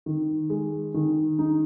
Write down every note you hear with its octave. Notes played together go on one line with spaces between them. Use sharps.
D#3
G#3
D#3
D#4